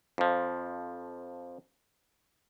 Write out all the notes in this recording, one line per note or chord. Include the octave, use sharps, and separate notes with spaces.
F2 F3